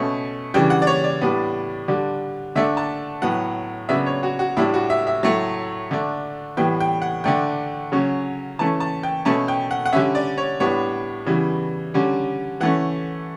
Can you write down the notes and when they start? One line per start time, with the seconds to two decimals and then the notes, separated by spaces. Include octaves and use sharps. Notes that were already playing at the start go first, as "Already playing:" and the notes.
Already playing: B2 A3 C#4
0.54 C#3 E3 G3 D4 G5
0.70 F#5
0.82 D5
0.87 C#5
1.04 D5
1.21 A2 G3 B3 D4
1.88 D3 G3 D4
2.55 D3 A3 D4 E5
2.77 A5
3.22 A2 F#3 B3 F#5
3.89 C#3 F#3 B3 D4 E5
4.06 C#5
4.23 F#4
4.39 F#4
4.57 A2 G3 D4 E4
4.74 F#4
4.90 E5
5.07 E5
5.23 A2 F#3 A3
5.91 D3 A3 D4
6.57 A2 E3 G3 B3 G5
6.80 G5
7.02 F#5
7.24 D3 A3 D4 G5
7.92 C#3 F#3 C#4
8.59 E3 A3 C#4 A5
8.80 A5
9.03 G5
9.25 B2 A3 C#4 A5
9.48 G5
9.71 F#5
9.86 F#5
9.93 D3 G3 C#4 E5
10.15 D5
10.38 C#5
10.60 A2 G3 B3 D4 C#5
11.26 C#3 E3 G3 B3
11.94 D3 G3 C#4
12.60 E3 A3 C#4 F#5